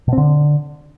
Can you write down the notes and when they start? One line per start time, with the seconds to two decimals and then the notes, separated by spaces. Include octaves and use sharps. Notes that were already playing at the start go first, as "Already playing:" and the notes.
0.08 B2
0.13 C4
0.18 D3